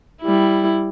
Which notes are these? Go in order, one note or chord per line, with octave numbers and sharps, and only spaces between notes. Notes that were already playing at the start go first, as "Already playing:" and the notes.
G3 E4